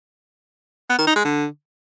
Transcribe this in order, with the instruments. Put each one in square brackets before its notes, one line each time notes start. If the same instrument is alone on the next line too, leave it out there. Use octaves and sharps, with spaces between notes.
[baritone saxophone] B3
D#3
D#4
G#3
D3